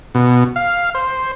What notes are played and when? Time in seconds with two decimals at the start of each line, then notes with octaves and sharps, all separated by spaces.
0.15 B2
0.56 F5
0.95 C5